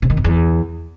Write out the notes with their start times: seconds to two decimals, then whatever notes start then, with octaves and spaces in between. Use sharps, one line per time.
0.02 C3
0.10 D#3
0.17 F2
0.24 E2